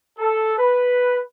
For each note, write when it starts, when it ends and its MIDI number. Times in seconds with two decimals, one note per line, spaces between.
0.19 0.54 69
0.58 1.21 71